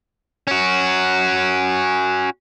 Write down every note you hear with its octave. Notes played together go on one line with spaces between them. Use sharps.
C#4 F#4